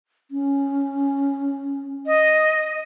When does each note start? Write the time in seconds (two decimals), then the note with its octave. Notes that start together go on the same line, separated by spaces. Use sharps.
0.31 C#4
2.06 D#5